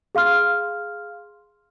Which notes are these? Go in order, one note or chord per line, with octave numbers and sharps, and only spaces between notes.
G#4 F5 C6 F6